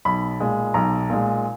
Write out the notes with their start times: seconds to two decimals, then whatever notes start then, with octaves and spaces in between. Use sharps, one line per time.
0.05 B1 B5
0.40 A#2 G#3
0.74 B1 A#5
1.10 A#2 G#3